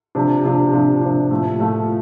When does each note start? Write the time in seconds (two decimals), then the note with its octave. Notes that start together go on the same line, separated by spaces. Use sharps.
0.15 C3 F3 D4
0.45 C3 F3 D4
0.73 C3 F3 D4
1.01 C3 F3 D4
1.30 A2 F3 A3
1.59 A2 F3 A3